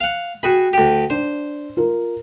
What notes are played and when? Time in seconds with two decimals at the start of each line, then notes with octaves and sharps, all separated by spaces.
0.01 F5 F#5
0.43 F#4 G#4 G5 B5
0.73 D2 G4
1.10 D4 C5
1.77 F4 A#4